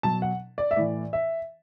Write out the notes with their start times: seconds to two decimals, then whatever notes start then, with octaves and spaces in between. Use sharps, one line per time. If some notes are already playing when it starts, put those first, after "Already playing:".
0.03 B2 F#3 A5
0.22 F#5
0.58 D5
0.71 E5
0.76 A2 E3 D5
1.13 E5